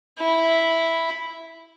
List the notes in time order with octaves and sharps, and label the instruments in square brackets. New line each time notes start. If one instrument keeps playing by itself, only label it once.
[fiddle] E4